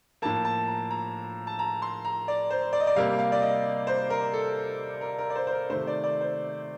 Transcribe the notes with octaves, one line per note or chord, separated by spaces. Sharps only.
A2 F3 A#3 A5
A5
A#5
A#5
A5
A#5
C6
A#5
D5
C5
D5
D#5
D5
C3 G3 A#3 F5
F5
D5
D#5
C5
A#4
A4
A#4
A#4
D5
C5
C5
A#4
C3 D#3 A3 C5
D5
D5
C5